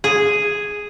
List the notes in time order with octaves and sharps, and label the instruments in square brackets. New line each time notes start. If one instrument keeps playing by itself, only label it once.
[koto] G#4